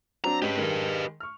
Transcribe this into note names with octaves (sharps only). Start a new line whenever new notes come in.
F#3 C4 D4 A#5
G#3 C#4 G4 B4
D#3 G#3 D#4
C#6 F6